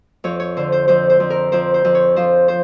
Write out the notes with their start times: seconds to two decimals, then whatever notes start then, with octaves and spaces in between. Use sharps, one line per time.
0.24 F2 C#5
0.40 C#5
0.57 D3 C5
0.72 C5
0.88 F2 C5
1.10 C5
1.20 F2
1.30 A#4
1.52 F2 C5
1.74 C5
1.85 F2
1.95 C#5
2.16 F3 C5
2.48 C5